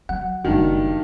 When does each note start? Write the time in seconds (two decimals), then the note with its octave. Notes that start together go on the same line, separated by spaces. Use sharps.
0.09 F#3 F#5
0.45 F#1 G2 D#3 F#4